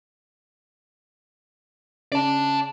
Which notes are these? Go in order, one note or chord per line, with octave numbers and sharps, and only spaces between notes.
C#3 D5 A5